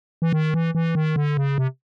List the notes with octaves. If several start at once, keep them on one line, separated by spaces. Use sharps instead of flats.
E3
D#3
E3
E3
D#3
D3
C#3
C3